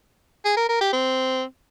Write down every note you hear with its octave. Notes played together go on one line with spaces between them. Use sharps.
G#4
A#4
A#4
G4
C4